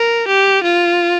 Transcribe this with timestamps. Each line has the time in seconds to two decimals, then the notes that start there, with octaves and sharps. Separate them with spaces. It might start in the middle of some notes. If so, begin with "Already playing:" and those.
Already playing: A#4
0.28 G4
0.64 F4